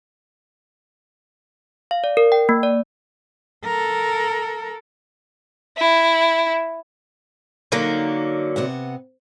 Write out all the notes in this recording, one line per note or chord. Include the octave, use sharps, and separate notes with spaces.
F5
D5
A#4
G5
A#3
D5
A4 A#4
E4
D3 F#3 A#3 D#4
C3 B3 F#5